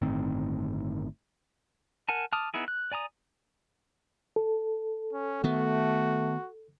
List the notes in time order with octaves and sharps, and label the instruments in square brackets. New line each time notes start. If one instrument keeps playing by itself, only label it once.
[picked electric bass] G1 A2 D#3 C4
[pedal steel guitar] A#4 F#5 G#5 A5
A5 D6 D#6 F6
B3 D#4 E4 G#4
F#6
D5 G#5 A#5 D#6
[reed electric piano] A4
[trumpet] C#4
[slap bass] D#3 B3 [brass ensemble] A3 [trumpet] F#4